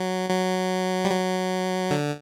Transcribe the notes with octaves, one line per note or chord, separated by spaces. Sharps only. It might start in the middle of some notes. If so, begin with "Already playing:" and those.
Already playing: F#3
F#3
G3
F#3
D3